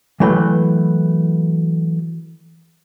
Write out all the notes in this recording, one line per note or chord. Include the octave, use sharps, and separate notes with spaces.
E3 F#3 A3 E4 B4 G5